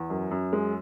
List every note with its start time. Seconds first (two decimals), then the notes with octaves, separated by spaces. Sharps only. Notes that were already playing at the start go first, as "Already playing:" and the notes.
Already playing: E2
0.10 F#2
0.31 F#2
0.53 G#3